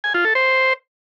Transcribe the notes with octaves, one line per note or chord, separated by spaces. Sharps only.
G#5
F4
A4
C5